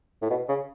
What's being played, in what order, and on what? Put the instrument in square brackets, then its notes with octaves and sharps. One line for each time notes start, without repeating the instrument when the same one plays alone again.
[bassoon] A2
B2
C#3